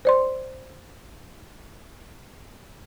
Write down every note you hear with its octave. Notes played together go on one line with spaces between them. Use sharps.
C5 D5 C6